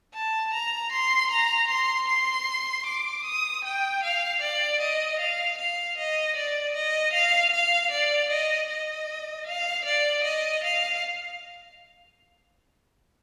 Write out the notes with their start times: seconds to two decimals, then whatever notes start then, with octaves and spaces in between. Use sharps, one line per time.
0.14 A5
0.54 A#5
0.93 C6
1.31 A#5
1.70 C6
2.08 C6
2.86 D6
3.25 D#6
3.65 G5
4.04 F5
4.42 D5
4.81 D#5
5.20 F5
5.58 F5
5.98 D#5
6.36 D5
6.75 D#5
7.14 F5
7.53 F5
7.91 D5
8.31 D#5
8.70 D#5
9.47 F5
9.85 D5
10.24 D#5
10.64 F5